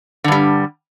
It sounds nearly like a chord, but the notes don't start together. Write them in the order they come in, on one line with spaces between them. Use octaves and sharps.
D3 G2 G3